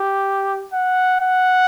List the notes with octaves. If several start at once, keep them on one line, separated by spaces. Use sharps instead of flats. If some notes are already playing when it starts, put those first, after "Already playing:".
Already playing: G4
F#5
F#5